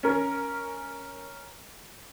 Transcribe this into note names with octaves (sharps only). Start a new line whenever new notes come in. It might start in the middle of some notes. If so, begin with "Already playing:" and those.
C#4 A#4